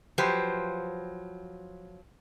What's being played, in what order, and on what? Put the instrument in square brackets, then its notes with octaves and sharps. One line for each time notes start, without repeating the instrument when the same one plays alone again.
[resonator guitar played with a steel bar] F3 F#3 G4 B4 C5